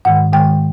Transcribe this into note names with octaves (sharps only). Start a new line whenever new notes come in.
G#2 D#3 G#3 F#5
G#2 D#3 G#3 G5